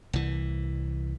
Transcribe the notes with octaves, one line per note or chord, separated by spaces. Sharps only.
C2 E3